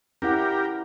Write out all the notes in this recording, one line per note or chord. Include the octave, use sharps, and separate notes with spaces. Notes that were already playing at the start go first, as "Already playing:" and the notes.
C#4 E4 G4 A#4 F#5